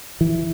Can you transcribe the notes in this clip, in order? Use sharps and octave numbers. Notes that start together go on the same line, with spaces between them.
E3